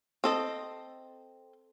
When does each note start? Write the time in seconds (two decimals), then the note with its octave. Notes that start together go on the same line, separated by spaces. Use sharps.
0.24 C4 A4 D#5